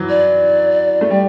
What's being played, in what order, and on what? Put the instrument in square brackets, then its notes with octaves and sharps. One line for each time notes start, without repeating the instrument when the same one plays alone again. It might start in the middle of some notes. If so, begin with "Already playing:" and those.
Already playing: [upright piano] E3 F#3
[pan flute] D5
[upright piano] A3
G3